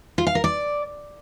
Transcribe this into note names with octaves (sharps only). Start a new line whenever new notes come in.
F4
F5
A#4
D5